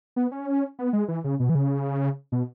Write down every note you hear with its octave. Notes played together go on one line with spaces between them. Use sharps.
B3
C#4
B3
G#3
E3
C#3
B2
E3
C#3
B2